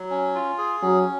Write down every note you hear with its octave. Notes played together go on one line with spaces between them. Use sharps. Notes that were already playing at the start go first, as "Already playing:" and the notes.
Already playing: F#3
C#4
F4
G#4
F#3 C#4